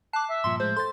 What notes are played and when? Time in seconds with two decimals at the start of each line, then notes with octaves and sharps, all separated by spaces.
0.13 A5 D6 F#6 C7
0.28 E5
0.44 G2 A#2 F3 C6
0.60 A2 F3 G#3 C5 G6
0.76 A4 C5 C6 A6